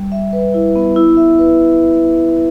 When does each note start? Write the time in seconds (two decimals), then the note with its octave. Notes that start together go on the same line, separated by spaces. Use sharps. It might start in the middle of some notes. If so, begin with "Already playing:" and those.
Already playing: G3
0.12 E5
0.33 B4
0.54 E4
0.76 B3
0.96 E4
1.17 E5
1.39 B4